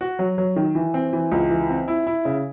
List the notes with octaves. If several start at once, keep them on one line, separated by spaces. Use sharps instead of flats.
F#4
F#3
F#3
D#3
E3
C4
E3
C#2
E3
C4
E4
E4
C#3